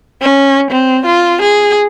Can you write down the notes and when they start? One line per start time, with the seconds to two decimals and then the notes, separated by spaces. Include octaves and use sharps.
0.22 C#4
0.71 C4
1.06 F4
1.42 G#4